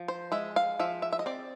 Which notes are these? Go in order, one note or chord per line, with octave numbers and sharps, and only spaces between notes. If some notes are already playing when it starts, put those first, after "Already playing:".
Already playing: F3
C5
G#3 E5
F5
F3 E5
E5
E5
D#5
C4 D5